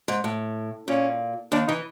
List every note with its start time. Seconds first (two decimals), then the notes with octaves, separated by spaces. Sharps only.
0.08 G#2
0.24 A2
0.88 A#2 C#4
1.52 D#2 D#3 D4
1.68 E3 D#4